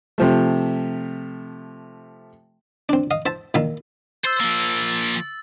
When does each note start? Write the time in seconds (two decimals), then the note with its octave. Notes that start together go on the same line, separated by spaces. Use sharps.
0.18 C3 F3 A3
2.89 C4 D4
3.11 D#5 F5
3.26 C5 E5 A5
3.54 A#2 D#3 E5 F5 A#5
4.25 C5 E6 A6
4.40 F3 A#3